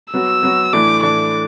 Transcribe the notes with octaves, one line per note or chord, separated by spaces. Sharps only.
F#3 B3 F#4 E6
F#3 B3 F#4
A2 E3 A3 D4 D6
A2 E3 A3 D4 D6